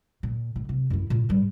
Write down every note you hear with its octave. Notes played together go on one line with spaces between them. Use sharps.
A#2
A2
C3
F#2 E4
A#2
G#2 G3